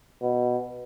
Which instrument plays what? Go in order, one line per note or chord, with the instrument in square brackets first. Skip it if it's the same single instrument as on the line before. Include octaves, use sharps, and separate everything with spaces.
[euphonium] B2